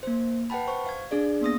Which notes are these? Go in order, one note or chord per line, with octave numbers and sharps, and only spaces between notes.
A#3 C5
B4 F#5 G5 A5 B5
C5 C#6
F5 G#6
D4 G#4 D5
A#3 B3 D#6 A#6